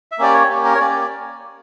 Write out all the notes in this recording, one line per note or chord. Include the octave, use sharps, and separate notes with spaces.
E5
A#3 C#4 G4 D5
C#5
A#3 C#4 G4
A#4
C#5
A#3 C#4 G4 D5